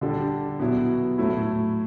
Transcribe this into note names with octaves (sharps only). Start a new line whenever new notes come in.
D3 G3 D4 A4
B2 F#3 B3 E4
A2 F#3 A3 E4